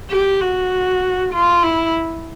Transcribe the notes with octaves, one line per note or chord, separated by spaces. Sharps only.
G4
F#4
F4
E4